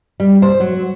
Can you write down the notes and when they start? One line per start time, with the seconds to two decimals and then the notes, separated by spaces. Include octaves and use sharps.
0.20 G3
0.42 C5
0.60 F#3